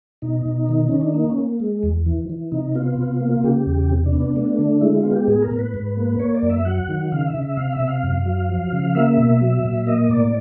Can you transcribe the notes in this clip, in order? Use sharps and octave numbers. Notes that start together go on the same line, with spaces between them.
B2 D#4
B2
D#3
D#3 C#4
D4
A#3 D#4
C#4
A#3
G#3
E2
E3
E3
C3 D#4
B3 F4
C3
A#3
C#3 G4
E2
C3
D4
B3
D4
A3
D3
G#3 E4
E4
F4
B3
G4
A2 G#4
A#4
A2
B4
G#2
A#3
A#3 C#5
D5
F#2
E5
F#3 F#5
D#3
C#3 F5
E5
C#3
E5
C3 F5
E5
C3
F5
F#2
F#3
F3
C#3
A#3 E5
B2
F#3
A#2
A#3 D#5
A2 D5